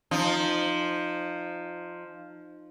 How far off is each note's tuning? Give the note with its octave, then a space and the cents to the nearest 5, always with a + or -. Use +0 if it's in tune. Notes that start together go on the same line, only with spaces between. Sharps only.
F3 +0 D#4 -25